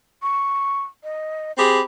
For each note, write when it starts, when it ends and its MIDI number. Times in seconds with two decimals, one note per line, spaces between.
0.22 0.82 85
1.04 1.52 75
1.58 1.79 60
1.58 1.79 67
1.58 1.79 68
1.58 1.80 83